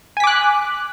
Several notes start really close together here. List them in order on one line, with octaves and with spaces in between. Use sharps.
G#5 B6 D6 F#6